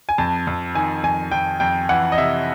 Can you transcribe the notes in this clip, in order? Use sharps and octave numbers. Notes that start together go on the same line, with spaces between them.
G#5
F2 A5
F2
D#3 G#5
F2 G#5
F2 G5
F2 G5
E3 F#5
D#5
C3 E5